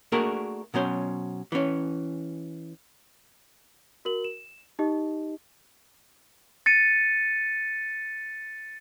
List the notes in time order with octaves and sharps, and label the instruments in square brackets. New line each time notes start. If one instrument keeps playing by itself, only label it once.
[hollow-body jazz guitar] A3 A#3 D4 F#4 G#4 A#4
B2 F#3 C#4 C5
E3 C#4
[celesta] F#4 A#4 F#7
E7
D#4 G4 D#5
[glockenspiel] A6 C#7 D#7